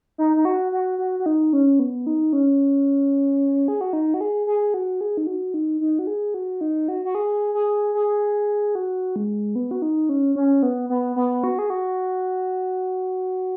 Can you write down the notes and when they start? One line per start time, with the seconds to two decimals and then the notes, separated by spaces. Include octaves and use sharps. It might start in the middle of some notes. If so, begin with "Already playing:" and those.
0.18 D#4
0.36 D#4
0.45 F#4
0.72 F#4
0.99 F#4
1.20 F#4
1.26 D#4
1.53 C#4
1.79 B3
2.07 D#4
2.33 C#4
3.68 G#4
3.81 F#4
3.93 D#4
4.14 F#4
4.21 G#4
4.47 G#4
4.74 F#4
5.01 G#4
5.17 D#4
5.27 F#4
5.54 D#4
5.81 D#4
5.99 F#4
6.07 G#4
6.34 F#4
6.61 D#4
6.88 F#4
7.05 F#4
7.15 G#4
7.54 G#4
7.95 G#4
8.75 F#4
9.16 G#3
9.55 B3
9.71 F#4
9.82 D#4
10.09 C#4
10.35 C#4
10.63 B3
10.89 B3
11.16 B3
11.44 F#4
11.59 G#4
11.70 F#4